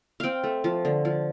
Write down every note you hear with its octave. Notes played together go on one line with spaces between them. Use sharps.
C4 F5 G5
A3
F3
D3
F3